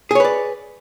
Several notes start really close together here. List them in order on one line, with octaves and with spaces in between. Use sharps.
G#4 C#5 B4 D5